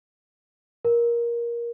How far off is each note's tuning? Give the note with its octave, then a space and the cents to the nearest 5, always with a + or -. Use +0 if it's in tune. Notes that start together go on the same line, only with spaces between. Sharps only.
A#4 +15